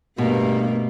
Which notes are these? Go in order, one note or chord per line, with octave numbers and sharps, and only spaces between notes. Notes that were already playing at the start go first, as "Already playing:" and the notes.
G2 B2 A3 A#3